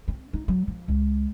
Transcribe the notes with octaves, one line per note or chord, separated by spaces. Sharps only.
C4
D#4
F#3
F3
C#2